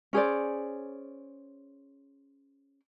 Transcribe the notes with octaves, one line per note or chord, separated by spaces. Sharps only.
C#4 G#4 C5 D5